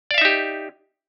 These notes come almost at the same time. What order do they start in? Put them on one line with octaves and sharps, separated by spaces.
D5 F5 E5 D#4 G4